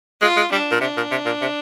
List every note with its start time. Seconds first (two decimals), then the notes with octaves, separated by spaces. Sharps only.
0.21 G#3 F4
0.36 G#3
0.52 G3 D4
0.71 A#2
0.81 C3 D4
0.97 A#2
1.11 C3
1.26 A#2
1.41 C3